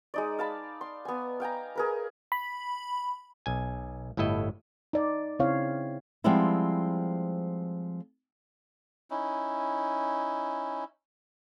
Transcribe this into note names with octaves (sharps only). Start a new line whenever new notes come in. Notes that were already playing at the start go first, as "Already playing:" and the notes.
G#3 D#4 D5
F5 A5 B5
C6
B3 G#5
F5 G5 G#5 A#5
G#4 A#4 B4
B5
B1 G#5
G1 A2 E4 A4 D#5
D#4 D5
C#3 C4 E4 C#5 F5
F3 G3 G#3 B3 C4 E4
C#4 D#4 E4